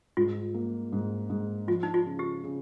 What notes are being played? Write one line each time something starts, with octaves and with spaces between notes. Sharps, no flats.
G#2 F4
A#3
G#2
G#2
F3 F4
D#4
F4
C#3
G4
C#3